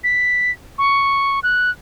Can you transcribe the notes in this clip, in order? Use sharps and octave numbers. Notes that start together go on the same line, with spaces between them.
B6
C#6
F#6